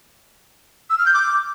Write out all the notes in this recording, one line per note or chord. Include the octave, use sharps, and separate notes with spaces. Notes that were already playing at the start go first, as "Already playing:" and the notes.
E6
F6
G6
D6